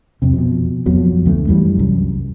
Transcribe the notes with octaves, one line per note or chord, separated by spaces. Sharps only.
F2 C3
B2 F3
F2 F3 F#3 B3
D2 G#3 A3
F#2 E3 F#3 G3
C2 F#2